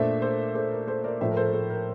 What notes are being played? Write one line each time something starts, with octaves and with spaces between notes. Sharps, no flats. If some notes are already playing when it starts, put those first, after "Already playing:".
Already playing: A#2 A3 D4 C5 E5
A4 C5
A4 C5
A#4
A4 C5
A#4 D5
A2 F3 A3 C5 E5
A#4
A4 C5
A#4
A4
A#4